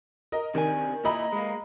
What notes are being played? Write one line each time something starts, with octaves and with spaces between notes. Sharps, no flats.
A#4 D#5
C3 D#3 D4 G#5
A#2 E4 D#5 A#5 B5
G#3 A#3